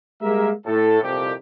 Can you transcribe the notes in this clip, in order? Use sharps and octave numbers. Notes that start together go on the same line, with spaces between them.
G3 G#3 A#3 A#4 E5
A2 A4
C2 F2 A#2 G4